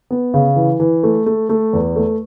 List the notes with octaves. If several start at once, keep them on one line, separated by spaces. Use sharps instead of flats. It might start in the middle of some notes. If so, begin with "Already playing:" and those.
B3
C#3
E3
E3
A3
A3
A3
E2
A3